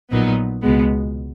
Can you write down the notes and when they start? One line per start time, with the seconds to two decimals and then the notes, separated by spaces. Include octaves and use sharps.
0.11 A#1 A#2 F#3 B3 D#4
0.62 C#2 B2 G#3 B3